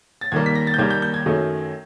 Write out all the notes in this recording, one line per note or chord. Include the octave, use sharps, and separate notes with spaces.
A6
D#2 D#3 G3 A#3 G#6
B6
A#6
A6
G6
D#2 D#3 G3 A#3 G#6
G6
G6
G#6
F#2 D#3 F#3 A3